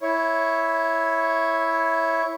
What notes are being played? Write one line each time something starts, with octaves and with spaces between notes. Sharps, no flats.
E4 C#5